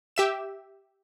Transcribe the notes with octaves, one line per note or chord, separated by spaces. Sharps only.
G4 E5 E7